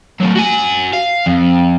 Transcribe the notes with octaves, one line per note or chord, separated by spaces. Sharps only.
F#3 A3
F#4 G#5
F5
F2